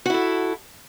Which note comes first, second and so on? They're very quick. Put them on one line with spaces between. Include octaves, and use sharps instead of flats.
F#4 E4 A4